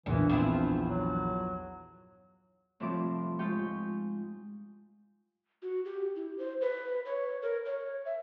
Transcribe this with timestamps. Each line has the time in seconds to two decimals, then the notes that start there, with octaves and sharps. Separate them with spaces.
0.06 A#1 E2 G2 A#2 E3
0.30 F3 B3 C4 E4
0.89 F#3
2.80 A2 C3 F3 G3 C4 D6
3.39 G#2 G#3 F4 G4 G5 C#6
5.62 F#4
5.85 G4
6.16 E4
6.38 C5
6.61 B4
7.05 C#5
7.42 A#4
7.66 C#5
8.05 E5